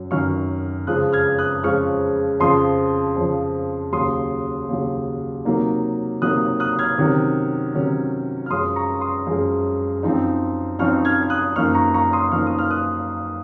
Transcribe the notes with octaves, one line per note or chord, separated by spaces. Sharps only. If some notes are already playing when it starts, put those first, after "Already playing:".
Already playing: F#2 F#3
F#2 D#3 F#3 C#6 F6
F2 C#3 F3 G#3 C#4 D#6 F#6
F6 G#6
D#6 F#6
F2 C#3 F3 G#3 C#4 C#6 F6
F2 C#3 F3 C6 D#6
F2 C#3 F3
D#2 C#3 F#3 C6 D#6
D#2 C#3 F#3
C3 F#3 A#3 D#4
C3 F#3 A#3 D#4 D#6 F#6
D#6 F#6
F6 G#6
C3 D#3 F#3 C#4
C3 D#3 F#3 C#4
F6
F#2 F3 G#3 C#4 C6 D#6
A#5 C#6
C6 D#6
F#2 F3 G#3 C#4
F#2 F3 C4 D#4
F#2 F3 C4 D#4 C#6 F6
F6 G#6
G#6
D#6 F#6
F#2 F3 A#3 D#4 C#6 F6
A#5 C#6
A#5 C#6
C6 D#6
F#2 F3 A#3 D#4 C#6 F6
D#6
F6
D#6 F#6